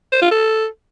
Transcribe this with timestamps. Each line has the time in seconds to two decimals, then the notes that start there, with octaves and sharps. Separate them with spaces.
0.13 C5
0.22 F4
0.31 A4